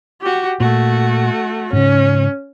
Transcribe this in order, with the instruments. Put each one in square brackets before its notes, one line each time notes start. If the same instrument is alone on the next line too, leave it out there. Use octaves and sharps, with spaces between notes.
[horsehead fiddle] F#4 G4
[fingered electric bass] A#2 [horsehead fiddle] A3 F#4
[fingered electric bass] G#2 C#3 [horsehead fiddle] C#4